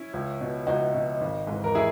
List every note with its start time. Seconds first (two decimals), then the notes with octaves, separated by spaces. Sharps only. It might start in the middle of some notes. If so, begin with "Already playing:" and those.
Already playing: C#4 E4
0.14 C#2
0.41 B2
0.67 C#2 D#4 F#4
0.94 B2
1.21 G#1
1.47 G#2 E3
1.64 A#4
1.75 E4 G#4